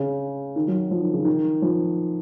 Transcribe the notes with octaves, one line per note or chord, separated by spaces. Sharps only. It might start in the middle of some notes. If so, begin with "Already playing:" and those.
Already playing: C#3
D#3
F#3
F3
D#3
C#3
D#3
F3